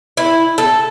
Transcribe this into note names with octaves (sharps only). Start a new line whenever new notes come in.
E4
A4